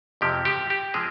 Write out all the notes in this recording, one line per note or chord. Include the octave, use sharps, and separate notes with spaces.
F2 C3 F3 G#3 C4 G4
G4
G4
F3 G#3 C4 G#4